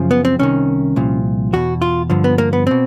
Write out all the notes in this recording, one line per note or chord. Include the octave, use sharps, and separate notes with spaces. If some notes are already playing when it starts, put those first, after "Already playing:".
Already playing: F#2 C#3 F3
B3
C4
C2 C3 D#3 C#4
C2 A#2 F3
E2 B2 F#4
F4
G2 D3 F3
B3
A#3
B3
B2 C4